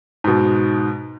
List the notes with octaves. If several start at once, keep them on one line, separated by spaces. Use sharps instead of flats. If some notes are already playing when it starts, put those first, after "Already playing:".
G#2 B2